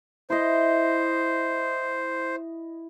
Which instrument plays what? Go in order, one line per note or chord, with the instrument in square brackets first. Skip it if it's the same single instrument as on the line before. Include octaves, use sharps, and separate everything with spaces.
[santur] E4 D#5 [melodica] C5